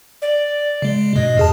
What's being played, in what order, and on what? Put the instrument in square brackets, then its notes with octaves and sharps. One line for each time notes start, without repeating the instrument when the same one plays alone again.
[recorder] D5
[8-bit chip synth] C#3 G#3
[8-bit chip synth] G2 B2 [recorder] D#5
[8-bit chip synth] E2 G#4 A5